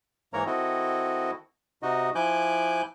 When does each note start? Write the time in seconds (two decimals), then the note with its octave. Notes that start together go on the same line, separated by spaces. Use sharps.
0.33 G#2 E3 A#3 A#4 C#5 A#5
0.46 D#3 C4 E4 F#4 A4 D#5
1.83 C3 D#4 F#4 D#5
2.15 F3 E4 G#5 D6 F#6 G6